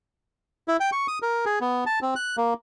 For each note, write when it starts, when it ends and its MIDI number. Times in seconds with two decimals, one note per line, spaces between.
0.68 0.77 64
0.80 0.90 79
0.92 1.07 85
1.08 1.19 87
1.22 1.45 70
1.46 1.59 68
1.61 1.84 59
1.86 1.99 81
2.02 2.14 60
2.16 2.36 90
2.37 2.54 58